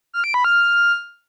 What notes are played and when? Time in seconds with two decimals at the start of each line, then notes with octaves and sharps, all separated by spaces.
0.14 F6
0.24 D7
0.34 B5
0.45 F6